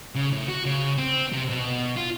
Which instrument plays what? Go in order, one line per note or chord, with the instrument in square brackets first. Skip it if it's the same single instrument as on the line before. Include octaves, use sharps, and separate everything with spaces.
[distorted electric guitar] C#3
A2
F#4
C#3
C4
C3
B2
F4